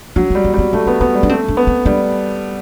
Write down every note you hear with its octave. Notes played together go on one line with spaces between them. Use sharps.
F#3 D4
G3 C4
B3
G3
B3
A3 C4
B3 D4
B3 C4
G3
D4
A3 C4
D4
B3
C4
G3 D4